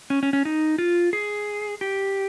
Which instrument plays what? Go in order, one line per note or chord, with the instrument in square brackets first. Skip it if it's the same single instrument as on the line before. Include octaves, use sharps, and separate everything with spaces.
[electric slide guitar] C#4
C#4
C#4
D#4
F4
G#4
G4